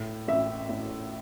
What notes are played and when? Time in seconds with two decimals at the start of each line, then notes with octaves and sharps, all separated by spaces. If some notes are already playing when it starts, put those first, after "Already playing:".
Already playing: A2
0.27 A1 E5
0.69 A2